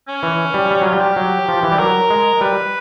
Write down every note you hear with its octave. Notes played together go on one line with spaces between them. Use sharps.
C#4
E3
G3
G3
F#3 F4
G3
G4
F#3
F3
E3
G3
F#3 A#4
G#3
G3 B4